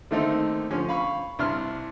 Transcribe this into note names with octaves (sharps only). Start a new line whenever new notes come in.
D3 D#3 A3 A#3 C4 D#4
D3 F3 C#4
F5 B5 C#6
C2 D4 E5 C6 F6